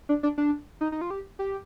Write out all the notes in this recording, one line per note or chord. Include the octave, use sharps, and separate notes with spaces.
D4
D4
D4
D#4
D#4
F4
G4
G4